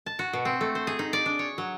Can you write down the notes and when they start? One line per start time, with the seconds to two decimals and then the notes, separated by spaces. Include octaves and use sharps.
0.06 A5
0.19 F#4
0.33 B2
0.45 C4
0.61 A3
0.75 C5
0.87 G#4
0.99 D#4
1.13 D5
1.26 D4
1.39 C#5
1.58 F#3